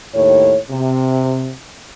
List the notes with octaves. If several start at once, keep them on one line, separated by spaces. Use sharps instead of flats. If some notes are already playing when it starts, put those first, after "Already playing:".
D#2 A2 C#5
C3